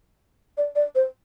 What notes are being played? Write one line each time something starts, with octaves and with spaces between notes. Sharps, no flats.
D5
D5
C5